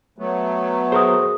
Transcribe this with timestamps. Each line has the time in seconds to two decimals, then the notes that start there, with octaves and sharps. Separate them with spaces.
0.18 F#3 A3 B3
0.92 F#4 G#4 A#4 C5 D#6